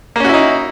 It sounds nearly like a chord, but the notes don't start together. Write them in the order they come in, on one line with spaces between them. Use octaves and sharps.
A#3 C#4 F#4 E4 D#4